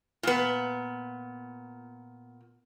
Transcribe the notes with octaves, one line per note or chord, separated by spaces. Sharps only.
A#2 B3